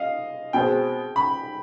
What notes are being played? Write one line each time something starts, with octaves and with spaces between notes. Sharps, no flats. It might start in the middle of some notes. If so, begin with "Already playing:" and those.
Already playing: D#5 F5
B2 G#3 C4 G5
B5